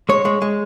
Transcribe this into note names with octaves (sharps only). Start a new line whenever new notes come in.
G#3 C#5
G#3
G#3